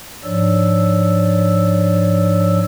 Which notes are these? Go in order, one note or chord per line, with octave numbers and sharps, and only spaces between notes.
G#2 F3 D4 C#5 D5 E6